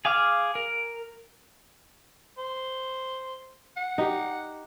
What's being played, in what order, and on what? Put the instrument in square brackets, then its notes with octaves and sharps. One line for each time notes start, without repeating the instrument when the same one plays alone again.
[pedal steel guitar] G#4 F5 D6 F6
A#4
[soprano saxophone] C5
F#5
[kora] D#4 G4